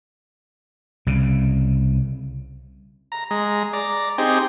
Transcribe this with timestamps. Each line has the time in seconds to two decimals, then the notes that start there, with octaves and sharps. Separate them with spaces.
1.07 C2 C#3
3.12 A#5
3.31 G#3 A#5
3.73 D5 A#5
4.18 C4 D#4 G4 G#4